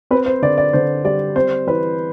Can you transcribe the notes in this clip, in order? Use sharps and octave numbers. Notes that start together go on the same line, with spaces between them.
C4 B4
C5
D3 D5
D5
D3 C5
G3 D5
C4 C5
E3 B4